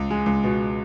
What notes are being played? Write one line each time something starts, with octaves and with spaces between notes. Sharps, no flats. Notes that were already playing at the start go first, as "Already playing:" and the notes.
Already playing: C#2
G#3
C#2
B2